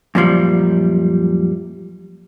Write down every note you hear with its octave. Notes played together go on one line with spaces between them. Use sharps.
F#2 A#2 F3 G3